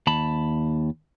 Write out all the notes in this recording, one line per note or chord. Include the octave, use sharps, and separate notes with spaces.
D#2 A5 B5